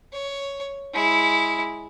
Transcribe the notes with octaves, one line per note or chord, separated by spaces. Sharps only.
C#5
G#3 E4